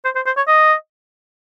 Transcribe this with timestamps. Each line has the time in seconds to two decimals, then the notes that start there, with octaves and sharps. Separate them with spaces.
0.05 C5
0.16 C5
0.26 C5
0.37 C#5
0.48 D#5